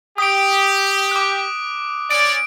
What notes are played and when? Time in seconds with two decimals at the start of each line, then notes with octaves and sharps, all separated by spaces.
0.18 G4 D#6 D7
1.11 D6 F#6
2.11 C#4 D5 D7